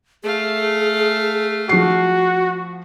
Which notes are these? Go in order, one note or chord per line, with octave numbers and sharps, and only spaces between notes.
A3 G#4 F5
F3 F#4 C7